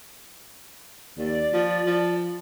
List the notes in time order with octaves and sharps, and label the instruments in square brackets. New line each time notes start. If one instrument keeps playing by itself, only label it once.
[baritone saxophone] D#2 [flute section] D5
[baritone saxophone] F3
F3